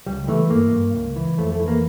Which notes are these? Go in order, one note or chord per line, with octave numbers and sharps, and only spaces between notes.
C#2 G3
E3 A3
G2 A#3
G2
C#2
E3
F2 A3
A3
E3
A#3